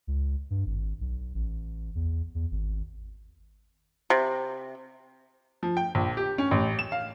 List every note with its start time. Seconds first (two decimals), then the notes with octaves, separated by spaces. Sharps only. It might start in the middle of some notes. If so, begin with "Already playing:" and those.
0.07 C#2
0.50 G2
0.66 G#1
1.01 B1
1.35 A1
1.95 E2
2.35 E2
2.51 G#1
4.10 C3
5.63 F3
5.77 G5
5.95 A#1
6.17 G4
6.38 C#4
6.51 A1
6.79 E7
6.92 F5